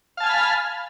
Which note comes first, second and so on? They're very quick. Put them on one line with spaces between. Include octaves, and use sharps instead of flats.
F5 A5 G#5 F6 B5